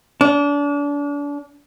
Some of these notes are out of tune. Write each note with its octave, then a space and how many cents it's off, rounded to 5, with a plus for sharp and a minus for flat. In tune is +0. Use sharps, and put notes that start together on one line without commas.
D4 -35